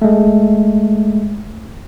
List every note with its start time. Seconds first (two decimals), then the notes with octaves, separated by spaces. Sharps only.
0.02 G#3 A3